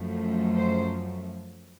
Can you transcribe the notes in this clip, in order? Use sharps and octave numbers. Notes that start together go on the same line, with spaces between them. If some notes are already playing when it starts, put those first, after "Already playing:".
Already playing: F#2 F3 A3
C5